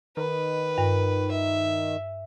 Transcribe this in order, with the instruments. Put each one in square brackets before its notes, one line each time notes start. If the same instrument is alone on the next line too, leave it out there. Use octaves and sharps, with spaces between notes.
[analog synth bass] D#3 [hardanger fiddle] B4
[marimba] G2
[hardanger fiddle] E5